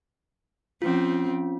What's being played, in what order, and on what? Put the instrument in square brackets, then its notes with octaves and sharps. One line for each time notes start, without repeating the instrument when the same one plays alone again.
[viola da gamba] F3 C4 [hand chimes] C#4 F4